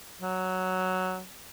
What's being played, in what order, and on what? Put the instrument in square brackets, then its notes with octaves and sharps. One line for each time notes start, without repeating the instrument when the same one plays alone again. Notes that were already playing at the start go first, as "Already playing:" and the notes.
[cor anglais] F#3